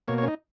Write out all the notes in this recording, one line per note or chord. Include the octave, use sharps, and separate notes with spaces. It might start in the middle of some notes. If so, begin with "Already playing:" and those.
B2 A#3 C#5
C#5
C#4
D#4